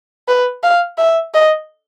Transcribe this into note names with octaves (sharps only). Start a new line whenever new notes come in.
B4
F5
E5
D#5